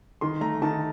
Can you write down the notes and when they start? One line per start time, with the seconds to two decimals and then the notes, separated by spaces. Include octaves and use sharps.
0.21 D#3 C6
0.41 A3 A#5
0.62 D#3 A5